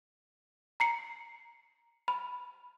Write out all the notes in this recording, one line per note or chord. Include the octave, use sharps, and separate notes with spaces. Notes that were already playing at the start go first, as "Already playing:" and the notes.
A#5 C7 C#7
B5